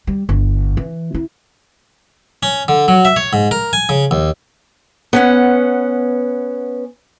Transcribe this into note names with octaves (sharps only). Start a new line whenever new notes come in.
G3
G1
E3
E4
C#4
D3
F#3
E5
C#5
G#2
A#4
G#5
C#3
D#2
B3 C#4 F#5